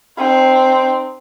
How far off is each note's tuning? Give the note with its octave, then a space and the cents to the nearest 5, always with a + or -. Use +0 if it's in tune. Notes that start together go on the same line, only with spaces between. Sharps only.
C4 +0 D#4 -35